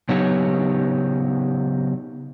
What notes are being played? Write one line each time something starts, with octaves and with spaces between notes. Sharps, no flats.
C#3 F#3 B3 D#4 G4 C#5